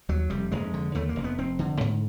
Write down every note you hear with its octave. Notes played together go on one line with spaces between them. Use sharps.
D#2 F#3
F1 G3
F1 G#3
D3
D#2 A3
A#3
F1
B3
F1 C4
D3
G#2